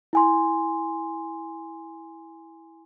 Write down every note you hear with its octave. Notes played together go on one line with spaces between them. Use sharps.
E4 G#5 C6